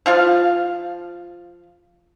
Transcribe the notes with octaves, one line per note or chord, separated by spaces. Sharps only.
F3 F4 F5